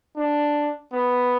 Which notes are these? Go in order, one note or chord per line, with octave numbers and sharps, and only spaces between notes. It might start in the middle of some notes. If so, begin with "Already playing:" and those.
D4
B3